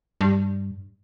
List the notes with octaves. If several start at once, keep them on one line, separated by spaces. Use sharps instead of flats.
G2